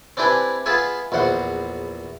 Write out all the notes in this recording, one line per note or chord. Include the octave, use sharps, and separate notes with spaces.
C4 D4 E4 G4 B4 G#5
B3 F4 G#4 E5 G#5
A#1 E2 C5 F#5